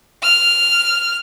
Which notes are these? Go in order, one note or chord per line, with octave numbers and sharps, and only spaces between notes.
F6